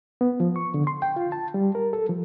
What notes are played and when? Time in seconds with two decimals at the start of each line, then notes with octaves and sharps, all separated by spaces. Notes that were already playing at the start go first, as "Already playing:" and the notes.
0.21 B3
0.40 F3
0.56 C#6
0.74 D3
0.87 C6
1.02 G5
1.16 F4
1.32 A5
1.54 G3
1.75 A#4
1.93 A4
2.09 F3